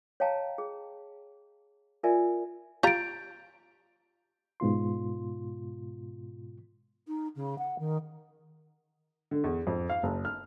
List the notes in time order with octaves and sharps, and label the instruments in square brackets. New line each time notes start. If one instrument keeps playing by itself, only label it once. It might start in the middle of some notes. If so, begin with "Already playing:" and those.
[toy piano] C#5 D#5 F5 G5 A5 A#5
G#4
F4 A#4 D5 E5 G#5
[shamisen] F4 G4 A#5 [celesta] G6 A6 D7
[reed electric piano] G#2 B2 F4 C6
[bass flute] D#4
C#3
F#5
D#3
[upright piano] D3
E2
F2
F5
F#1
F6